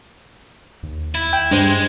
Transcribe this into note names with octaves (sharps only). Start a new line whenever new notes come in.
D#2
E4
G5
G2 G#3 D4 C5